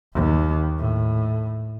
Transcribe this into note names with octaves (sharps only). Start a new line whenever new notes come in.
D#2
A2